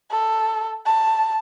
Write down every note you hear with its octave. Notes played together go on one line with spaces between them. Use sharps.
A4
A5